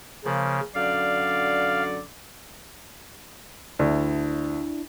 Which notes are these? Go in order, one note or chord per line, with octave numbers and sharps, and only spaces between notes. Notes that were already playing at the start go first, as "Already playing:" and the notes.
C#3 F3 A#3
F#2 D3 D5 F5
D2 D4 E4